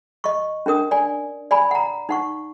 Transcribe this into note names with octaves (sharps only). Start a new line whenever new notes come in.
D#5 C#6
C#4 D4 A#4 D#6
D5 G#5
D5 G#5 B5
F#5 A#5
D#4 F#5 C#6